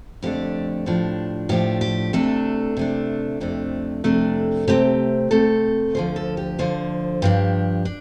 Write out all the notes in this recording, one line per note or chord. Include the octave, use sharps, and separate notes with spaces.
F2 D3 A3 D4 G4
A2 F3 D4
A2 F3 D4 G4
G4
C3 A3 D4 A4
C3 A3 D4
F2 C3 A3 D4
F2 C3 A3 D4
C3 A3 C4 G4
C3 A3 C4 A4
D2 D3 F3 C5
A4
G4
D2 D3 F3 C5
G2 F3 D4 G4
D4